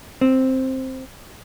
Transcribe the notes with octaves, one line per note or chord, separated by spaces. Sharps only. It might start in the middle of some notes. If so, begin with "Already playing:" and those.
C4